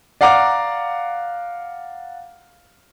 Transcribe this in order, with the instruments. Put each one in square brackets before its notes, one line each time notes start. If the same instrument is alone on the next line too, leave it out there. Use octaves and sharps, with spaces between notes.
[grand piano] D5 F5 F#5 A#5 D6